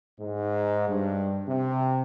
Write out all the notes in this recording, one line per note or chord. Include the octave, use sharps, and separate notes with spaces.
G#2
G2
C3